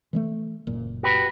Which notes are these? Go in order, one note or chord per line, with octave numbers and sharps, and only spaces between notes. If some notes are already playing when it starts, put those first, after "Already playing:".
E3 G#3 A3
F#1 A#2
F#4 G4 B4